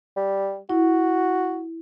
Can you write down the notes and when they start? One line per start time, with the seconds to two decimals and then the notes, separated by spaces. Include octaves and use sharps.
0.16 G3
0.70 E4 F#4